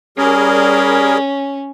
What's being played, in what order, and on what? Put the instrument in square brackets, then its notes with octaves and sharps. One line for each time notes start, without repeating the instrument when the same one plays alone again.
[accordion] G3 G#4 A#4 [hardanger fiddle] C#4